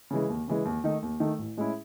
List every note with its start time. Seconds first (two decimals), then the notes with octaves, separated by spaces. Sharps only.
0.10 C#3 E3 G#3
0.29 D#2
0.48 C#3 E3 G#3
0.65 D#2
0.84 D#3 A3 D#4
1.03 D#2
1.20 D#3 A3 D#4
1.38 A1
1.57 A2 G#3 C#4 E4